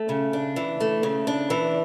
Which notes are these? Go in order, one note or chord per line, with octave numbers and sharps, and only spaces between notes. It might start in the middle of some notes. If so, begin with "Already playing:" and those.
Already playing: A3
C#3
D4
E3
A3
C#3
D4
E3